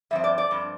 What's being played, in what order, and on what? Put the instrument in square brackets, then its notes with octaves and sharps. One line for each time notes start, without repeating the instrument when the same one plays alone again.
[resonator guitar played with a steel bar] G2 F3 C4 E5
D5
D5
G2 F3 C4